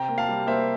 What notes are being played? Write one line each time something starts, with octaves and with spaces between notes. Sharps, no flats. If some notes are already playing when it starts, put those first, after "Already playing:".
Already playing: C3 G5 A#5
A#3
F5 A5
G3
A#3 C5 E5